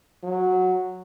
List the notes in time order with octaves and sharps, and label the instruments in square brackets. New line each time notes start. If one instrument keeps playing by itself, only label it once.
[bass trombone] F#3